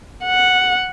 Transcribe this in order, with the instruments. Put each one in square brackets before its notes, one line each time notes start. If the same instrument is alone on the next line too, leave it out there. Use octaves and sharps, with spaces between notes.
[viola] F#5